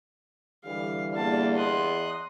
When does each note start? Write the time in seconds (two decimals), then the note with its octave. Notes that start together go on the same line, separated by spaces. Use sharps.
0.65 D3 E3 G3 F5
1.13 E2 A#3 F5 A5
1.56 D#5 C6 D#6 F#6